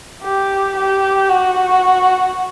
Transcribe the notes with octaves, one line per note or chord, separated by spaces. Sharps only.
G4
G4
F#4